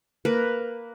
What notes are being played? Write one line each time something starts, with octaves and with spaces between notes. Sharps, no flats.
A#3 A#4 B4